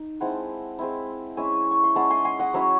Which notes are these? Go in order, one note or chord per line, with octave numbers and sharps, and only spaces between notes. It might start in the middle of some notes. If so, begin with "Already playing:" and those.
Already playing: D#4
G#3 C4 E4 F#5 A5
G#3 C4 E4
G#3 C#4 E4 E5 G#5
C#6
C6
G#3 C#4 E4 F#5 A5
G#5 C6
G#5 C6
D#5 F#5
F#3 C#4 E4 C#5 E5